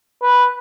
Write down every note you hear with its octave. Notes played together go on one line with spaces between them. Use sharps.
B4